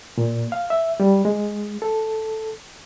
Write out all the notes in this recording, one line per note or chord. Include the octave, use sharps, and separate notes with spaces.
A#2
F5
E5
G3
G#3
A4